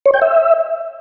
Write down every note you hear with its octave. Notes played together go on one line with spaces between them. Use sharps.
C#5
G5
E5